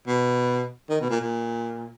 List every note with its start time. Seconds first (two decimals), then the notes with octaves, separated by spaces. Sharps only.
0.07 B2
0.90 D#3
1.01 B2
1.10 A#2
1.21 A#2